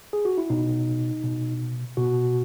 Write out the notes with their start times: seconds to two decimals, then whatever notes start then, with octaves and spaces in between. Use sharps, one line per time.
0.13 G#4
0.25 F#4
0.38 E4
0.50 B2 D#4
1.24 B2
1.97 B2 F#4